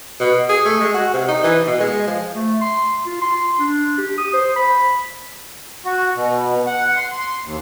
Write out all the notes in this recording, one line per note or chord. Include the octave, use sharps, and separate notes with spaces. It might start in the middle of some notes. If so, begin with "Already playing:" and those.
B2
G#4
A3
G#3
F#4
C3
D#4
E3
B2
G#3
F3
A3
C6
F4
C6
D4
G4
D#6
C5
B5
F#4
B2
F#5
C6
C6
D#2